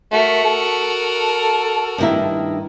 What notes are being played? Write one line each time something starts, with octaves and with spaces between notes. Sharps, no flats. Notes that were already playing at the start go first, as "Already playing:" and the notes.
A3 F#4 A#4
A4
G2 D#3 E4